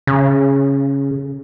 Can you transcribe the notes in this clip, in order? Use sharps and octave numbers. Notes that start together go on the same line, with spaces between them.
C#3